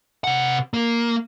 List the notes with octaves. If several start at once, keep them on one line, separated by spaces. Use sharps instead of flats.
C3 F#5
A#3